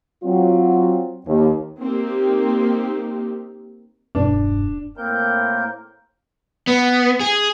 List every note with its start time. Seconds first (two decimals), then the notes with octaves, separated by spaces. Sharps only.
0.23 F#3 C4 F4
1.27 D#2
1.80 A#3 C4 D#4 G4
4.15 E1 G2 D4
4.97 A2 A#3 C4 A#4 G6
6.67 B3
7.20 G#4